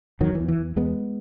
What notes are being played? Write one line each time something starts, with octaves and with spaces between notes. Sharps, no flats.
E2 D#3 F#3
E3
E2
E3
E2
E2 G#3 B3